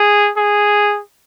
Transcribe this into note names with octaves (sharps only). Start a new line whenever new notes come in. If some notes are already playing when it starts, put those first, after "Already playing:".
Already playing: G#4
G#4